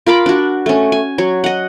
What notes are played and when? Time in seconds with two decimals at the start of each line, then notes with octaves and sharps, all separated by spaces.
0.07 F4 A#4 B5 D6
0.26 D4 F#4
0.66 A3 C#4
0.92 G#5
1.18 F#3 C#5
1.44 D#5 F#5